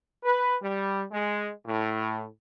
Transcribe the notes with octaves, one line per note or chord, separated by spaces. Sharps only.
B4
G3
G#3
A2